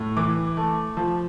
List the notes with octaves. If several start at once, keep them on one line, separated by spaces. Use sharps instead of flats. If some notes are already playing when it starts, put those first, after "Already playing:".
Already playing: A2
E3 D6
A3
F3